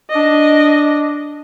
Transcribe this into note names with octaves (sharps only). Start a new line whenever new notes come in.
D4 D#5